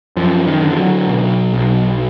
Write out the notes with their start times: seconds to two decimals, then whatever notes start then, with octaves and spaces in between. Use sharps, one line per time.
0.16 F#2 F3
0.47 D#3
0.62 D3
0.72 F3
0.77 F#3
1.07 B2
1.53 B1